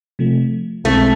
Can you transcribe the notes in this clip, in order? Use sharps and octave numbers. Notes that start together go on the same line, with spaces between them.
C3 F3 A3
B1 B2 G#3 A3 C4 E4